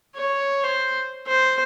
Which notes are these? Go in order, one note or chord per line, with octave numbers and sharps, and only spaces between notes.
C#5
C5
C5